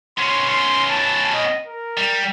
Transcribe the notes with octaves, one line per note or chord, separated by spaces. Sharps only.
B3 C#4 C6
C6
A5
D#5
A#4
G3